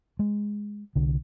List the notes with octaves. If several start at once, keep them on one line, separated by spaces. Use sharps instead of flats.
G#3
C2 D3